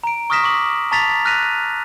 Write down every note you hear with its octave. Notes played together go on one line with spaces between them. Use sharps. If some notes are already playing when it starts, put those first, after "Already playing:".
A#5 D7
C#6 D#6 F6 A#6 B6 E7
C#6 D6 F#7
A5 A#5 C#6 A6 B6 F7
F6 F#6 A#6 B6 D#7 F7